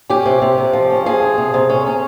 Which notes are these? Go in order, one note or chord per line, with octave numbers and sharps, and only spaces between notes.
C#4 G4
C3
C3
C3
F3
C#4
F3 G#4
F3
C3
C3
C#4
C#4